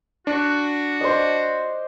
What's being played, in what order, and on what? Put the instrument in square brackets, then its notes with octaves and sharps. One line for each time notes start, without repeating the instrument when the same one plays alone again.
[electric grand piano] D4 [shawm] F#4
[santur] C5 D5 D#5